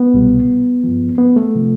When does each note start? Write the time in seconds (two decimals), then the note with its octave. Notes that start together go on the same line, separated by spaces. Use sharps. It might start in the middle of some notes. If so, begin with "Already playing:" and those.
Already playing: B3
0.14 C2 B2 G3
0.84 G2 F3
1.18 B3
1.36 A3
1.55 C3 F3